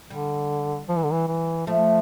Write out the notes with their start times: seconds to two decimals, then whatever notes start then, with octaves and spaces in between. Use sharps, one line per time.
0.10 D3 G3
0.89 F3
0.97 E3
1.04 D3
1.12 E3
1.28 E3
1.67 F3 A3